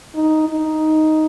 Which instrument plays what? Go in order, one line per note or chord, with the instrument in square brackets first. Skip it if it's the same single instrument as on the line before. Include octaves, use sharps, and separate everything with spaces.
[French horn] D#4
D#4